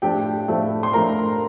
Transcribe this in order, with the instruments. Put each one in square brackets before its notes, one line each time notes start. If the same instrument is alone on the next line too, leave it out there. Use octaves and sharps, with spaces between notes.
[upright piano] A2 F3 A3 D4 G4 G5
A2 F3 A3 D4
C6
A2 F3 A3 D4 A#4 A#5